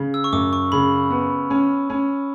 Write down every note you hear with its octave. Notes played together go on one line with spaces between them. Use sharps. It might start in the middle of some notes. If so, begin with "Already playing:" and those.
Already playing: C#3
E6
C#6
F#2 D6
C#6
C#3 B5
B3
C#4
C#4